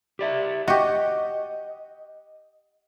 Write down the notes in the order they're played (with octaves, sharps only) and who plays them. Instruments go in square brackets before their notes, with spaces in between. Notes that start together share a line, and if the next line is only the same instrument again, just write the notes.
[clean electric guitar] G4 D5 E5
[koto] F#4 G4 [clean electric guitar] D#5